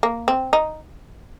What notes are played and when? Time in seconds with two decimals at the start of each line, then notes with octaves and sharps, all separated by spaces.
0.03 A#3
0.28 C4
0.53 D#4